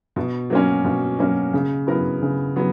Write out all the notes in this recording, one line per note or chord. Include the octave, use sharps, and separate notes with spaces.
B2
F#3 A#3 C#4
B2
F#3 A#3 C#4
C#3
F#3 B3 E4 A#4
C#3
F#3 B3